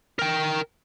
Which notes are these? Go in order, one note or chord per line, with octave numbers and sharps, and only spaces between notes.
A#4 G5